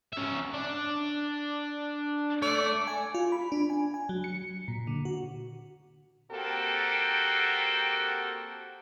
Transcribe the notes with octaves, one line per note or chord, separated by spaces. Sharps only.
C#4 E5
D4
A3 D5
G#5
F4
B5
D4
G#5
G#5
F#3
C#7
A#2
D3
F#4
A#3 C4 F#4 G4 A4